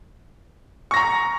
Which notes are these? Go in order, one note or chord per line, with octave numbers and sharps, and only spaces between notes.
A#5 C#6 A#6